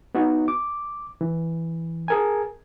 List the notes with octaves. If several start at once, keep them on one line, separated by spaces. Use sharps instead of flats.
B3 D#4 F#4
D6
E3
G#4 A#4 G#5